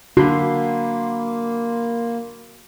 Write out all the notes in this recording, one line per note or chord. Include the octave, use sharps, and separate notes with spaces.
D3 A#3 F#4 B5 C6